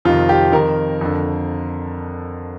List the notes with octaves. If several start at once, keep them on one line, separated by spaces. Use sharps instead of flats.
F2 C3 D#3 F4
G4
F2 D#3 A#4
F2 D3